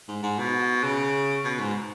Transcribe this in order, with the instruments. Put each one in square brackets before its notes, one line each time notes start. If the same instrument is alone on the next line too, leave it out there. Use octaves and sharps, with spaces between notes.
[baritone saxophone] G#2
G#2
B2
C#3
B2
G#2